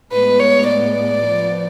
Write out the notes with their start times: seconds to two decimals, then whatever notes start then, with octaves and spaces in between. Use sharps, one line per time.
0.11 A2 G#3 B3 B4
0.40 C#5
0.68 D5
1.24 F3 B3